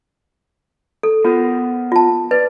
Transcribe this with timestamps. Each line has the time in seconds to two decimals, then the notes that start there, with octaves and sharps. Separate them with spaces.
1.03 A4
1.24 B3 F4 A#4 C5
1.92 F4 A5
2.31 B4 D5